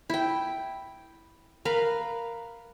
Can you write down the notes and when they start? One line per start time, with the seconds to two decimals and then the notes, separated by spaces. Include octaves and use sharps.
0.10 E4 G5
1.65 A#4 B4 F5